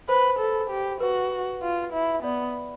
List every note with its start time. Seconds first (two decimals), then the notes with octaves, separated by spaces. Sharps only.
0.09 B4 C5
0.39 A4
0.71 G4
1.00 F#4 B4
1.63 F4
1.93 E4
2.24 B3 D5